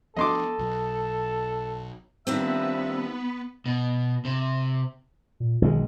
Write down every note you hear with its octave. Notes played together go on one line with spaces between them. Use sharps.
F3 B3 D4 A4 D#5 C6 D6
B1 F#3
D#3 F3 G3 B3 C4 D4 B4 E5
B2
C3
A#2
B1 D#3 G#3